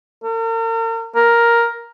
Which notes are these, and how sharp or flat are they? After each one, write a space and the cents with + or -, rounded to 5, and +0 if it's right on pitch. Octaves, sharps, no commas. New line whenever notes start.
A#4 -40
A#4 +5